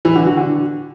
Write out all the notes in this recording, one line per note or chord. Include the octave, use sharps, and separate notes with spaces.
E3
D3
F#4
D3